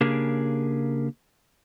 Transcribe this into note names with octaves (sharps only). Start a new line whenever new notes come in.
C#3 A#3 D4 G4 G#4 A#4